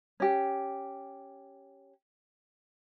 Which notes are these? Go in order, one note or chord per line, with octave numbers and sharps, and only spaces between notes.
C#4 G4